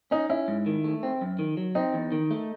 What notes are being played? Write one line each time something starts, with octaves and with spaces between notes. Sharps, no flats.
C#4 D#4
C#4 E4
G#2
D#3
A3
C4
F#2
D#3
F#3
C4 D#4
E2
D#3
A3